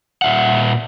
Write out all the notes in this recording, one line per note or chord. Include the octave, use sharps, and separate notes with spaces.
A#2 E5 F#5